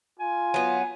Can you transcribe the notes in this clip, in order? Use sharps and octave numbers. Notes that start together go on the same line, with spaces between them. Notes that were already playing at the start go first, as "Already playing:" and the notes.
F4 G#5
F#3 B3